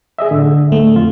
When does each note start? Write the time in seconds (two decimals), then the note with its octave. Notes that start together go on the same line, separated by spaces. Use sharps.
0.19 G#4 D#5 E5
0.31 A2 D3
0.72 A3
0.95 F2 F4